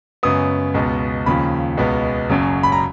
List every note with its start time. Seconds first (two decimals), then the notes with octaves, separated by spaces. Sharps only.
0.23 F#2 C#3 G#3 B3 D#6
0.74 C#2 B2 G#3 B3
1.26 D#2 C#3 F3 B5
1.77 C#2 B2 G#3 B3
2.30 F#1 F#2 C#3 F#3
2.63 B5
2.72 A#5